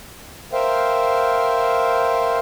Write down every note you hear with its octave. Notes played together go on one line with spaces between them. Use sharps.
A#4 C5 E5 F5 G5